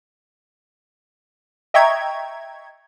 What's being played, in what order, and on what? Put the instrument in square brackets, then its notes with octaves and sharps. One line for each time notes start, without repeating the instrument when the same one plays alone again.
[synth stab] D#5 E5 G5 A#5 C#6 G#6